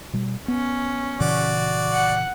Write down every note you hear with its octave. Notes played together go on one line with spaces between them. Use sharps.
B2 G3
B3 C#4
A#2 C#3 E3 F#4 D5
F#5